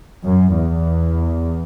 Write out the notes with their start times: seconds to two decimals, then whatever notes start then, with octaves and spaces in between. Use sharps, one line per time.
0.24 F#2
0.55 E2